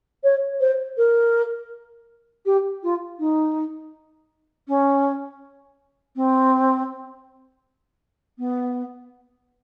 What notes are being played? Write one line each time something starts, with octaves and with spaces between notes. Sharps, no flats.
C#5
C5
A#4
G4
F4
D#4
C#4
C4
B3